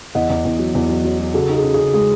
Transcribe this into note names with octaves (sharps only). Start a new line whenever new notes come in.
E2 D#5 F#5
E2
E2
F#3
E2
F#3
F#3
F#3
C#3 F#4 A4
D#4 G#4
C#3
C#3 G#4
G#3 G#4